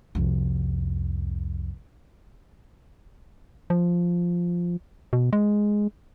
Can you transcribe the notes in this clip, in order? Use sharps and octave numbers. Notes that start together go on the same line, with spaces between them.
C2 F2
F3
B2
G#3